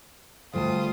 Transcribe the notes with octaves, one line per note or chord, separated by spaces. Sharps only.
D2 G3 A3 F4 A5 D#6